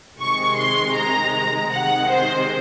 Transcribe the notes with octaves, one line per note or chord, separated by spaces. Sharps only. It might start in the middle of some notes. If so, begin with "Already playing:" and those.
C3 D#3 G#3 C#6
C6
A#5
C3 D#3 G#3 F#5
C5